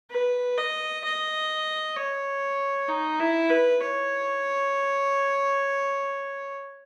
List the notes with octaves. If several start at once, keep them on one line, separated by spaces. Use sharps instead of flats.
B4
D#5
D#5
C#5
D#4
E4
B4
C#5